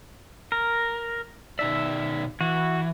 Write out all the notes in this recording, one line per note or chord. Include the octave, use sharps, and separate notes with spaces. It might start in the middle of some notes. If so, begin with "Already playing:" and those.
A#4
B2 D#4 D5 E5
E3 F#4